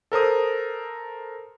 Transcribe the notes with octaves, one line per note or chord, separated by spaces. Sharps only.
A4 A#4 C5 D#6